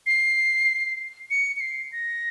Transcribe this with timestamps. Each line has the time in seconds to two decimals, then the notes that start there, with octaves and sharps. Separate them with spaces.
0.06 C7
1.30 C#7
1.56 C#7
1.61 C7
1.92 A#6